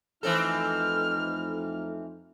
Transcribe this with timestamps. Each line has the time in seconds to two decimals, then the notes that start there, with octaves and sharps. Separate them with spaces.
0.23 F2 E3 A3 C4 D#4 A4 F6